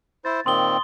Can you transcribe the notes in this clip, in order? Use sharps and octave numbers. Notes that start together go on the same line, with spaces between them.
E4 C5 A6
A#2 D#3 C4 C6 D#6 G7